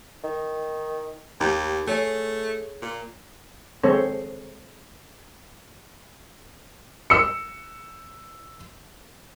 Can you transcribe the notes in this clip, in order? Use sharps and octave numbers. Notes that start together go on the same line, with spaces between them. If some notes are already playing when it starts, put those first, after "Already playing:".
D#3
D#2 D#4 G4 A#4
A3 G#4 C#5 G#5
A#2
D#3 G#3 C4 A4 C5 C#5
E6 C#7